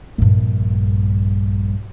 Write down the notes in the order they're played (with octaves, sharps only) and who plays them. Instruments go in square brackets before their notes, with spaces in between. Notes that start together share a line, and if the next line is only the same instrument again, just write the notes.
[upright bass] A#1 G2